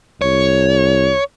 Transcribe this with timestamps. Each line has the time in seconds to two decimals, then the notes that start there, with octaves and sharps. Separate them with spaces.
0.22 C2 C#5